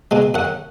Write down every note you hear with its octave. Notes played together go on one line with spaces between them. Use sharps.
B2 G#3
F#2 F#5